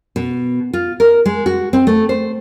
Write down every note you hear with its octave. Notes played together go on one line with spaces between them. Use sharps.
B2
F4
A#4
G#3
F#4
C4
A3
C5